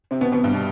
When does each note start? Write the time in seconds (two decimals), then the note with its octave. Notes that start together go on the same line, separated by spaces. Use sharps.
0.11 C3 C4
0.21 B2 B3
0.32 B2 B3
0.44 G2 G3
0.54 B2